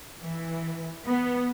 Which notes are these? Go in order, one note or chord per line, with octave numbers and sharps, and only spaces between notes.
E3
B3